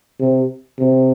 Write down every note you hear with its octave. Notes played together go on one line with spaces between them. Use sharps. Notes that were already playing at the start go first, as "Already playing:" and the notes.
C3
C3